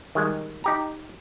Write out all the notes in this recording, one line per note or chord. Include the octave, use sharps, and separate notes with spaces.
D#3 G3 G#3
D#4 G4 A#5